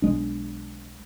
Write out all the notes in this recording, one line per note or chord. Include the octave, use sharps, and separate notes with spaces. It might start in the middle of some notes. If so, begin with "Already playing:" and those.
B1 G#3 D4